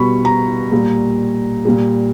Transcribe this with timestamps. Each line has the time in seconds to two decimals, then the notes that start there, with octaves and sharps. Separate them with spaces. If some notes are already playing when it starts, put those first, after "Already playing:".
Already playing: B2 G3 B5 C#6
0.25 A#5
0.72 A#2 G3
1.65 A#2 G3